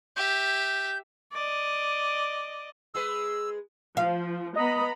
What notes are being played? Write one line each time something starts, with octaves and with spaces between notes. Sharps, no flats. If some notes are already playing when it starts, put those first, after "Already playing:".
G4 E5 G6
D5 D#5
G#3 G#4 B4 E6
F3 F5
B3 D#5 A#5 B5